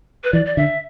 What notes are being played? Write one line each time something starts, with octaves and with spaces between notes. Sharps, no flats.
B4
E3 D5
D5
D3 E5